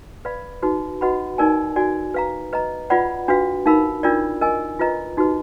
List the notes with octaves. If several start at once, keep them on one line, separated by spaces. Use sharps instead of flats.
B4 D5 F5 B5
D#4 F#4 B4
F#4 B4 D#5 F#5 B5
D#4 A#4 D5 G#5
F#4 D5 G#5
B4 F5 A#5
B4 D#5 A#5
F4 B4 D5 F#5 B5
D4 F#4 B4 F5
D#4 A#4 F5 B5
D4 F4 A#4 D5
A#4 D#5 G#5
F4 B4 D#5 A#5
D#4 F#4 B4